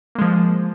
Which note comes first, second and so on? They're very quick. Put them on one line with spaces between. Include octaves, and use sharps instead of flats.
A#3 G#3 F3